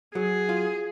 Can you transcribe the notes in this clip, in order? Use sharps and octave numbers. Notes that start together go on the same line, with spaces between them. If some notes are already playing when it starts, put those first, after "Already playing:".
F#3 G#4
F4